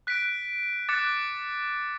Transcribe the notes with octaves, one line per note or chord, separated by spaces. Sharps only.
F#6 B6 D7
D6 F#6 A6 C#7